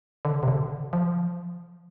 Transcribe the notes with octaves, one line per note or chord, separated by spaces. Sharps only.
D3
C3
D3
F3